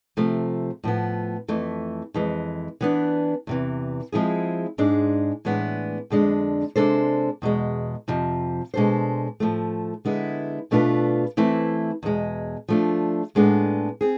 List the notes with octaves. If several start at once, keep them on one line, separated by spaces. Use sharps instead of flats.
C3 F3 A3
A2 F3 B3
F2 E3 A3
F2 E3 G#3
E3 B3 D4
E2 C3 E3
F3 G#3 C4 E4 G#4
G#2 G#3 D4 G#4
A2 E3 G#3 B3 D4
F2 D3 G#3 D4
C3 G#3 D4 A4 C5
E2 B2 G#3
F2 C3 F3
B2 G#3 D4 A4 C5
A2 F3 A3
D3 G#3 B3 E4
B2 A3 D4 F4 B4
E3 A3 C4 E4 B4
E2 B2 G#3
F3 A3 D4 F4
A2 G#3 B3 D4 A4
C4 G#4